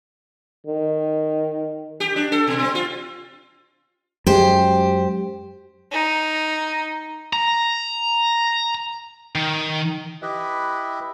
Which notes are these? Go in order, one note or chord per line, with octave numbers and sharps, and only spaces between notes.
D#3
G4
D4
A4
B2
C4
F4
F#2 G#3 G4 C5
D#4
A#5
D#3
E4 G4 B4 D#5 E5